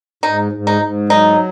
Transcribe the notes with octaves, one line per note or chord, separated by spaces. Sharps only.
G#2 D#4
G#2
D#4
G#2
F#3 D#4